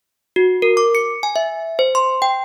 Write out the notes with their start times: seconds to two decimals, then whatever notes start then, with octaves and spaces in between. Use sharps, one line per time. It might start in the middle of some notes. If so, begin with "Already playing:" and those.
0.36 F#4
0.62 A#4
0.77 D6
0.95 C#7
1.23 G#5
1.36 E5
1.79 C5
1.95 C6
2.22 G5